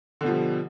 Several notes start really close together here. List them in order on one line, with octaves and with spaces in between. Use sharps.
D3 B2 F3 G3